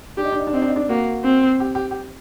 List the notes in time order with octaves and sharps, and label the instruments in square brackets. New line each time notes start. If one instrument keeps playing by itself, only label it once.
[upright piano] D4 [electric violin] G4
[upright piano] D#4
D4
D#4
D4
[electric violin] C4 [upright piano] D#4
[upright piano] D4
D#4
D4
[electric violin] A#3 [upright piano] F#4
[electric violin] C4
[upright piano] G4
G4
G4